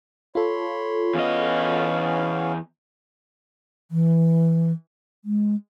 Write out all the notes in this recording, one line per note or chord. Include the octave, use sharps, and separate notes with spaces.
F4 A4 C#5 B5 C6
E2 B3 C#4 D#5 F5
E3
G#3